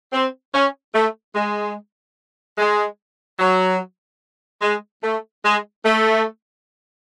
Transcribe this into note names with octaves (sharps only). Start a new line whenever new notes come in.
C4
C#4
A3
G#3
G#3
F#3
G#3
A3
G#3
A3